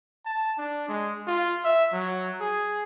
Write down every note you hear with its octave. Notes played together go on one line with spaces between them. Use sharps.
A5
D4
G#3
F4
E5
F#3
G#4